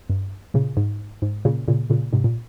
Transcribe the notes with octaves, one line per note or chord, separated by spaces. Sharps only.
G2
A#2 C#3
G#2
G#2
A#2 C#3
A#2 C#3
A#2 C#3
G#2 C3
A#2